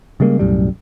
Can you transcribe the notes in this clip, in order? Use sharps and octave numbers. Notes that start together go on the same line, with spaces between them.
C#3 G3 G#3 A#3
B1 F#2 A2 G3